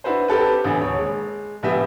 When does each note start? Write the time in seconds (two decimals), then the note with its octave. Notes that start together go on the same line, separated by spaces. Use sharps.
0.04 D4 E4 F#4 B4 C5
0.28 C4 G4 A4 B4
0.64 A1 D3 B3 C4 G#5
0.81 D#1 C#5
0.99 G#3
1.63 A#1 A2 B3 G4 E5